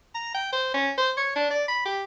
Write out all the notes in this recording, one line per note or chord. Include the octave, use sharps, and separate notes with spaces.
A#5
G5
C5
C#4
C5
C#5
D4
D5
B5
G4